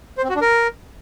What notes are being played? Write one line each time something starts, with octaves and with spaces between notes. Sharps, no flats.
C5
C4
F#4
D4
A#4